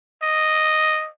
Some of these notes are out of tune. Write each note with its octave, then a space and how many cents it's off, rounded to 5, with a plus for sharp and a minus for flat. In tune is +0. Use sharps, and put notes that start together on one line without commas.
D#5 +0